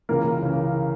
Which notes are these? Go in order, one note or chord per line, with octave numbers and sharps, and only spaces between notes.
C#2 C#3 E3 A#3 A#4
C#3 E3